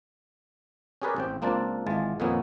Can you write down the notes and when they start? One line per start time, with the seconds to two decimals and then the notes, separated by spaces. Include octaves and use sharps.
1.02 C#4 G4 G#4 A#4 B4 D5
1.16 A1 C4 G5
1.42 C#2 A#3 C4 D4 F4 A5
1.86 G#1 E3 G#3 F4 A5
2.20 F2 A#2 D#3 A#3 B3 C#4